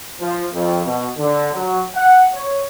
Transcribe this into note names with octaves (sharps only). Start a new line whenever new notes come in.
F3
F2
B2
D3
F#3
F#5
C#5